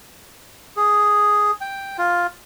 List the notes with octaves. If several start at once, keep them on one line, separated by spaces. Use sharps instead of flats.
G#4
G5
F4